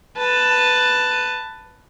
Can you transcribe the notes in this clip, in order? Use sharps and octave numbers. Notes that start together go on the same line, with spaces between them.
B4 A5